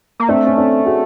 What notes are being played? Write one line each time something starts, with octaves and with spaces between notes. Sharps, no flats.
A#3
A3 C4 D4
C#4
C4 D4
F#4 G#4